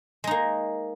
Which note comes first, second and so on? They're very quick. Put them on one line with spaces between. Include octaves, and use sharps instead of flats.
G#3 D#4 A#3